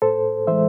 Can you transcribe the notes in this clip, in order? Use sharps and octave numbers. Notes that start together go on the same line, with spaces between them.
A2 A4 C5
E3 G#3 C5 E5